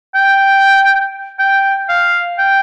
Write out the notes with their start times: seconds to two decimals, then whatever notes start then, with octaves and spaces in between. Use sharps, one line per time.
0.14 G5
1.39 G5
1.89 F5
2.38 G5